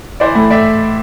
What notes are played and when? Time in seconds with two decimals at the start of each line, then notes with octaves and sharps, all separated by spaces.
0.20 E3 C5 D5
0.35 A2
0.50 A2 D5 E5